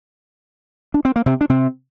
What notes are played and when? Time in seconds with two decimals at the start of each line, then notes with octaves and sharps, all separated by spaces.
0.94 D4
1.05 C4
1.16 A#3
1.26 C3 C4
1.41 D4
1.49 C3 C4